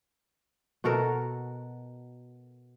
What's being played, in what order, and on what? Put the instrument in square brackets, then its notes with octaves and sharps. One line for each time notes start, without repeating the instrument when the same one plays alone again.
[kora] B2 F#4 A4 A#4